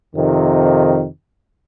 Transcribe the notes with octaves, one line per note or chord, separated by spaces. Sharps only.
F2 C3 D#3